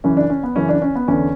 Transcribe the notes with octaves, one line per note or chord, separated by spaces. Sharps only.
F#2 C#3 E3 C#4
D4
C#4
B3
F#2 C#3 E3 C#4
D4
C#4
B3
E2 D3 C#4